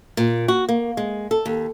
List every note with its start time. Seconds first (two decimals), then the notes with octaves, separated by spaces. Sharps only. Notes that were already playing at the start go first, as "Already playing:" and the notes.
0.17 A#2
0.48 F#4
0.69 A#3
0.97 G#3
1.31 A4
1.46 D#2